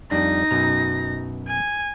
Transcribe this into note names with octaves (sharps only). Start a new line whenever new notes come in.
F2 G3 D4 D#4 A#6
F#2 B2 A#5
G#5